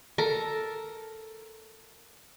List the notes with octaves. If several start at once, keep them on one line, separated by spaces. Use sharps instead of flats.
A4 A#4